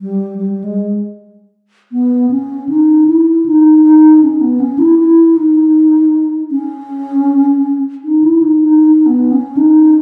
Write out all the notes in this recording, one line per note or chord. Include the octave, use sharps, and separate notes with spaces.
G3
G3
G#3
B3
C#4
D#4
E4
D#4
D#4
C#4
B3
C#4
E4
E4
D#4
C#4
D#4
E4
D#4
D#4
D#4
B3
C#4
D#4